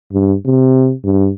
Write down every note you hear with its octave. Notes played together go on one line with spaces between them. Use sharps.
G2
C3
G2